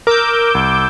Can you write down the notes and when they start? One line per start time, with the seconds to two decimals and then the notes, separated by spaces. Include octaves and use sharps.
0.07 A#4 D6 E6 G6
0.55 C2